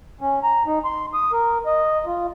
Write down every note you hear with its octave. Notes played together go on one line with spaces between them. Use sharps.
C#4
A#5
D#4
C6
D#6
A#4
D#5
F4